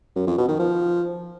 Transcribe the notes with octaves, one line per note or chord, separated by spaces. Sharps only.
F#2
F2
B2
D#3
F3